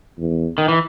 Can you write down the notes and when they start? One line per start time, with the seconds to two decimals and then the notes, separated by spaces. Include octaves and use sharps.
0.19 E2
0.58 D#3
0.68 E3